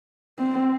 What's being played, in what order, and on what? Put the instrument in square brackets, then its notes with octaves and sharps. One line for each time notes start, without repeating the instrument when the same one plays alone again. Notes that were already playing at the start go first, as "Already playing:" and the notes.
[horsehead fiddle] C4